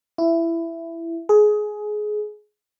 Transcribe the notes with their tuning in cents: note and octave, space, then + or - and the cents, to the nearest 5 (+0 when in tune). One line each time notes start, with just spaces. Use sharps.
E4 +15
G#4 +20